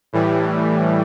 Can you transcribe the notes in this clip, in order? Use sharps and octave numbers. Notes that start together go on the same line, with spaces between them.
A2 E3 G3